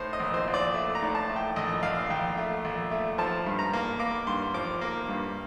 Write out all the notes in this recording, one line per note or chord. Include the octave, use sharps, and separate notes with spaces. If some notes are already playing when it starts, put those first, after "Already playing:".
Already playing: A2 C5
D#5
A#1
C5
A#1
D5
A3
A#5
A2
A5
A3
G5
A#1 D#5
A#1 F5
A#1 G5
A3
A#1
A3
F3 A5
G2
A#5
A#3
A#3 D6
G2 C6
F3 D6
A#3
G2